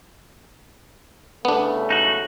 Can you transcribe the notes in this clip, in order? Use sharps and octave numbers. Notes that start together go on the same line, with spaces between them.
C2 C#3 A3 B3 D4
D#4 F#4